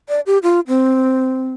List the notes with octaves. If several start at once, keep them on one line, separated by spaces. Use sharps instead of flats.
D5
G4
F4
C4